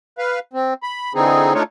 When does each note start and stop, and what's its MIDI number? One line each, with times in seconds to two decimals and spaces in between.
0.18 0.39 71
0.18 0.39 77
0.53 0.74 60
0.83 1.13 83
1.15 1.53 50
1.15 1.53 52
1.15 1.53 60
1.15 1.53 63
1.15 1.53 68
1.54 1.63 57
1.54 1.63 62
1.54 1.63 63
1.54 1.63 65
1.54 1.63 73